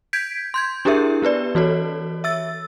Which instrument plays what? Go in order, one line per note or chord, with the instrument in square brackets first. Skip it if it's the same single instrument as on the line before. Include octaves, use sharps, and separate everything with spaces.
[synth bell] G6 G#6 B6 D7
C6 G6 G#6
D4 E4 G4 G#4 A#4 E5
B3 G4 B4 D5
E3 F#4 A4 C#5
E5 E6 A6